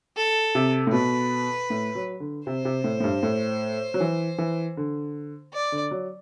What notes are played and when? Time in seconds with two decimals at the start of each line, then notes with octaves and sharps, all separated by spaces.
0.16 A4
0.55 C3
0.87 A2
0.92 B2 B4
1.70 A2
1.95 F#3
2.20 D3
2.46 C3 C5
2.65 C3
2.84 A2
3.00 A2
3.04 G2
3.23 A2
3.94 F#3
4.00 E3
4.38 E3
4.77 D3
5.53 D5
5.72 D3
5.91 F#3